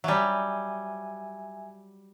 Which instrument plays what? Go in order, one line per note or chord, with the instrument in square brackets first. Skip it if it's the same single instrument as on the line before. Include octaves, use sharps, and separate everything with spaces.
[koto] F#3 G3 [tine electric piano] E5 G#5